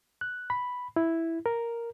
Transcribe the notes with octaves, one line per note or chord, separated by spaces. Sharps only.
F#6
B5
E4
A#4